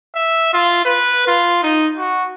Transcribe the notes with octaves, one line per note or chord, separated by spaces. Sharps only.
E5
F4
B4
F4
D#4
F#4